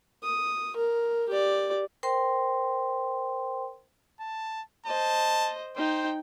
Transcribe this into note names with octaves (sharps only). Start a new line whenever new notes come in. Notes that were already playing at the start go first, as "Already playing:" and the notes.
D#6
A#4
G4 D5
A#4 C5 G5 C6
A5
C5 D#5 A5
D#4 C5 G5